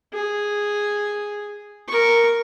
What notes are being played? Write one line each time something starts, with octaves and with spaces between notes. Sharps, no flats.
G#4
A#4 C#6